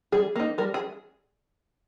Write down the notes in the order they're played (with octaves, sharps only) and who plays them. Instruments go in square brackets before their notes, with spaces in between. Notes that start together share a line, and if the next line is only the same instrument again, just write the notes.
[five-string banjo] G3 G#4
A#3 D#4
G3 A#4
G#4